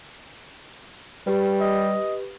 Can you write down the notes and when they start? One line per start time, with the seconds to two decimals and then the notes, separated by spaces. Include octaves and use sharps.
1.27 G3 G4 B4
1.61 D#5